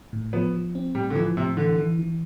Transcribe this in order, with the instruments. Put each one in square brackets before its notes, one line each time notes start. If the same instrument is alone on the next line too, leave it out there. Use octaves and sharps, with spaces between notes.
[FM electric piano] A2
[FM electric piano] F3 [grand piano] B3
[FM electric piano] F3
C4
[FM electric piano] A2 [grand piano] G3
[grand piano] D3
[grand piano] E3 [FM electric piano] F3
[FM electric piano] A2 [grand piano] C3
[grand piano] D3 [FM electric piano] E3
[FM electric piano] E3
E3